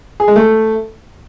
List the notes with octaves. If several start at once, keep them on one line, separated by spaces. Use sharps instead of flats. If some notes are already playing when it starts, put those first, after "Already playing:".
G#4
G#3
A3